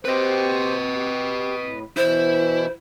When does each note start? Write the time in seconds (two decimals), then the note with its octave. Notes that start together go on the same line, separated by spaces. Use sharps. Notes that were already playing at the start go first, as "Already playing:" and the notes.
0.05 C4 G4 B4 C5 D#5
0.95 G4
1.62 A2
1.97 B2 E3 E4 C5